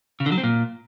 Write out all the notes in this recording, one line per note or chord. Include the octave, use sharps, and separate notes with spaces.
C#3
D3
F#3
C4
A#2